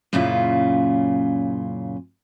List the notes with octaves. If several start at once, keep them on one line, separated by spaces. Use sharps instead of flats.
F#2 A#2 C#3 C#4 E4 F4